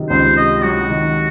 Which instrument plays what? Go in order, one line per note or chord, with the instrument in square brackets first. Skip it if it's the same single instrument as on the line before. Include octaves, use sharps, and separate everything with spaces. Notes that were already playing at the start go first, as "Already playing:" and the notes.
Already playing: [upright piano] C3 D#3 F#3
[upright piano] C#2 [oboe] C5
[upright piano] C3 [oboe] D#5
[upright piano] F#3 [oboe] F#4
[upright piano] D#3